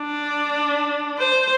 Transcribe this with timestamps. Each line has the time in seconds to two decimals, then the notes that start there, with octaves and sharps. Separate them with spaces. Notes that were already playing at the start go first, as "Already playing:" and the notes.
Already playing: D4
1.18 C5